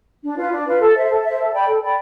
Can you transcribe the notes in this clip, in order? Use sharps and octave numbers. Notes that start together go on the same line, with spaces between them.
D4
F4 B4
D4
F4 B4
A4
C5 E5
A4
C5 E5
A4
D5 G5 B5
A4
D5 G5 B5